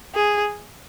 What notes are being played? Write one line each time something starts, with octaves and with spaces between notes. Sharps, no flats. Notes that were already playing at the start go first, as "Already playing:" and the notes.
G#4